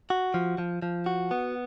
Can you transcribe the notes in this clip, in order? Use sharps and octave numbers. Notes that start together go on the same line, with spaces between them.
F#4
F3
F3
F3
F#4
B3